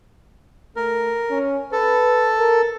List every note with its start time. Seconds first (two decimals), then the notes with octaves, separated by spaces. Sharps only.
0.76 A3 A#4
1.30 C#4
1.72 A4 B4
2.39 A#4